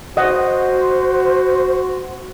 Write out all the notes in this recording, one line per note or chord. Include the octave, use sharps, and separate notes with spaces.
F#4 C5 D#5 F#5